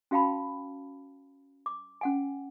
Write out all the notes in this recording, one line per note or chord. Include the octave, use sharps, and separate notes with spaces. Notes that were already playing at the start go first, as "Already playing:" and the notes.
C#4 F#4 F5 G5 A5 B5
D6
C#4 F#5 G#5